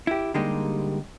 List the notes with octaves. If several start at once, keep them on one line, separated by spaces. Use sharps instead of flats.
E4 G4
D3 G3 G#3 A#3 D#4 G4